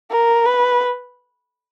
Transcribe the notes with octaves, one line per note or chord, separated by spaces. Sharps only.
A#4
B4